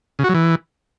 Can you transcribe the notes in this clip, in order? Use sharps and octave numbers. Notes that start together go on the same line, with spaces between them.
C#3
F#4
F#3
E3